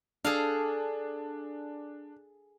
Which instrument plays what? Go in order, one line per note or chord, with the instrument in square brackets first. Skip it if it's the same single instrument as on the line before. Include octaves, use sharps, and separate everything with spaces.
[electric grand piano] D4 [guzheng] G#4 A4 F5